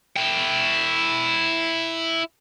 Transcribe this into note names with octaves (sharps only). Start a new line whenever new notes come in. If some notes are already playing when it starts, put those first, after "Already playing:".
E4 G5